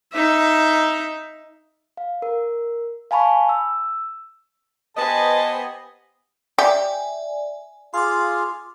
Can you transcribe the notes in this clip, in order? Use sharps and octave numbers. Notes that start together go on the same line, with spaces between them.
D#4 E5
F5
A#4
F5 G#5 A5 B5 C#6
E6
B3 G4 B4 C5 D#5 G#5 A5
G4 D5 E5 G#5
F4 G#4 F5 C6 D6